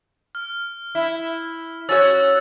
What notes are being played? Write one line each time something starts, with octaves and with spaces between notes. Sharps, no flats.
F6
E4
C#4 F#4 C#5 E6 A6